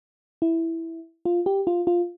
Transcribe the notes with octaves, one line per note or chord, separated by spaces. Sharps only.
E4
F4
G4
F4
F4